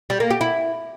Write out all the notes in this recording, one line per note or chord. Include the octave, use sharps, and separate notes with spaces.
G3
A#3
G4
E4